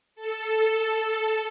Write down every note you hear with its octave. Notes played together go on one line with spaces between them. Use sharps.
A4